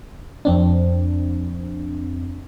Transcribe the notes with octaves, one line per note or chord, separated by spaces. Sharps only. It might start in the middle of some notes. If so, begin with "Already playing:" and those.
F2 C4 D4